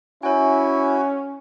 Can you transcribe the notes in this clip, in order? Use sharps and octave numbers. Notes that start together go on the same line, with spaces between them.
C#4 E4 F#4 C#5 G#5